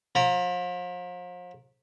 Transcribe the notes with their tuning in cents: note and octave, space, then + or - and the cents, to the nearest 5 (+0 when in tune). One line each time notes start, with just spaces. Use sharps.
F3 +40 A#5 +0